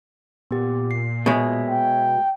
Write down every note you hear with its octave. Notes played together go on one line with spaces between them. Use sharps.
A#2 B3 G4
C7
B2 G#3 C#5 E5
G5